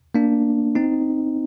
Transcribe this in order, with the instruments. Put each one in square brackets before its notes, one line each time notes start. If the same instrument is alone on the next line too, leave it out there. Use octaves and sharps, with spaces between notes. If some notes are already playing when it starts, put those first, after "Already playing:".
[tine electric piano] A#3 D4
C4 D#4